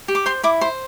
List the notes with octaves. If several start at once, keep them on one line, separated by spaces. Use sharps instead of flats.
G4
D6
C5 C6
E4 D6
C5 C6